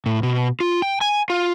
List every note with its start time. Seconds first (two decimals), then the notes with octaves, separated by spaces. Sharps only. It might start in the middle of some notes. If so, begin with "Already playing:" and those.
0.06 A2
0.23 B2
0.60 F4
0.82 G5
1.01 G#5
1.30 F4